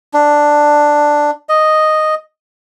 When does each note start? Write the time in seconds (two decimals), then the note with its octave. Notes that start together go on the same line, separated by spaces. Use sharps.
0.14 D4
1.49 D#5